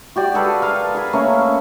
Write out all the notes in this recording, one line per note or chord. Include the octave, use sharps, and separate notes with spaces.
F#4 G4 D5
G#4 A4 B4 F5
A#4 F5 C6
G#4 B5
A3 A#3 C#4